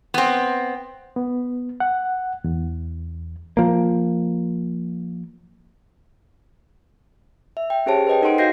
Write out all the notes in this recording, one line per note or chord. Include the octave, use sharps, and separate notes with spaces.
B3 C4
B3
F#5
E2
F3 A#3
E5
G5
C#4 G4 G#4 C5 C#5 A5
B4 C5 D#5 G5
D#4 A4 F#5 C6 D7
F#4 D#5 F5 G6 A#6 C7